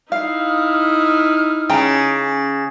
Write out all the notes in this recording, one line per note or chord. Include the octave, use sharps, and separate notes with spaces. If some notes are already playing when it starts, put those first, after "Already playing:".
D#4 E4 F5 F6
C#3 G5 A#5